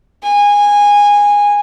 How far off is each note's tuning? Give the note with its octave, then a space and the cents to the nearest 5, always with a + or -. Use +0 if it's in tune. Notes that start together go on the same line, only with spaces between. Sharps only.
G#5 -15